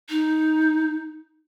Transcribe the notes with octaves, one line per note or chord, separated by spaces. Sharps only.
D#4